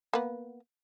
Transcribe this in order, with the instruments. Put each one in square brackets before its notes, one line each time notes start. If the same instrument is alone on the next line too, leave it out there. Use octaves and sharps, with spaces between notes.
[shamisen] A#3 B3